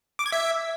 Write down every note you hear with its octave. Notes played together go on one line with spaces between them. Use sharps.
D6
G#6
E5